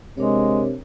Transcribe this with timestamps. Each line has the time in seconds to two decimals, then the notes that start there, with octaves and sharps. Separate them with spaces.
0.17 C3 G#3 D4 A#4 C#5